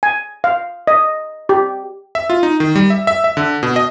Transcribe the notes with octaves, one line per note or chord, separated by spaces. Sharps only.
G#5
F5
D#5
G4
E5
F4
D#4
D#3
G3
E5
E5
E5
D3
B2
D#5